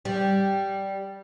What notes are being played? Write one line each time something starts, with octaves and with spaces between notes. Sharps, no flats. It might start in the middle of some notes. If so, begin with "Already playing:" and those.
G3